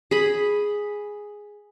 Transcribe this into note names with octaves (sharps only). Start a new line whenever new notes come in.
G#4 B5